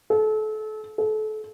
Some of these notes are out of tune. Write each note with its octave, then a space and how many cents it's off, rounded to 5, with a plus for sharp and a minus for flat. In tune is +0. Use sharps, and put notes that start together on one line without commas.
A4 -30
A4 -30